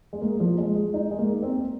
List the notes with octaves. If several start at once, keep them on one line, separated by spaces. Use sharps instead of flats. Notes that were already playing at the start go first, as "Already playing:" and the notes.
G#3
A#3
F3
G#3
G#3
D#4
G#3
A#3
C4